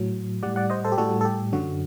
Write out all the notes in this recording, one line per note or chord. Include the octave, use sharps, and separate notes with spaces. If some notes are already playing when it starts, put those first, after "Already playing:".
Already playing: A2 F#3
A2 G3 D5 F#5
D5 F#5
C5 D#5
A4 C5
G4
A2 G3 F#4 A4
A4
G4
F#2 D3 F#3 F#4